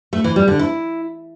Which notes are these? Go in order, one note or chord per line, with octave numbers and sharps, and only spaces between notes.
A3
E3
G3
D3
E4